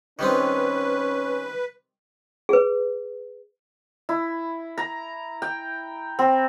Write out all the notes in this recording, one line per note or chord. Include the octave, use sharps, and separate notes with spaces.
D#3 G3 C4 C#4 B4
G#4 B4
E4
A#5
G5
C4